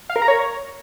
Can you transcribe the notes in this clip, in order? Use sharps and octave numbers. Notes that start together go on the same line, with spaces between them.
F5
A#4
A#5
C#5